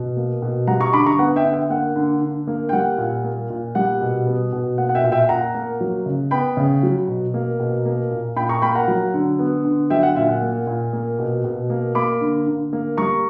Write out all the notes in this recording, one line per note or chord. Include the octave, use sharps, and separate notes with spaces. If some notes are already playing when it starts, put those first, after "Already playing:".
Already playing: B2
A#3
B2
G3 F#5 A#5
A#5 C#6
D3 B5 D6
A#5 C#6
B3 F#5
E5 G5
D3
E5 G5
A#3 F#5
D3
D3
A#3
G5
G3 F#5
A#2
A#3
A#2
G3 F#5
B2
B3
B2
A#3 F#5
F#5
E5 G5
A#2
E5 G5
A#2 F#5 A#5
A#3
F#3
C#3
B3 G5 B5
C#3
F#3
B2
A#3
B2
A#3
A#2
A#2 G5 B5
A#5 C#6
A#3 G5 B5
F#5 A#5
F#3
D3
B3
D3
F#3 E5 G5
F#5
A#2 E5
F#5
A#3
A#2
A#3
B2
B2
A#3
A#3 B5 D6
D3
D3
A#3
G3 A#5 C#6